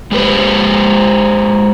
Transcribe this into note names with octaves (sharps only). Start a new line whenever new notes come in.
G#3 G4 B4 C5